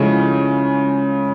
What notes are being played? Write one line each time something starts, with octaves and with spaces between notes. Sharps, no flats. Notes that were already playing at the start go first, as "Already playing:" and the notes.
Already playing: C#3 F3 G#3 C#4 E4 A4